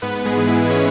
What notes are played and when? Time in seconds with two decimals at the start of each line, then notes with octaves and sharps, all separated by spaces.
0.02 G#2 B3 B4
0.25 G#3 G#4
0.37 E3
0.48 E4
0.70 C#4 C#5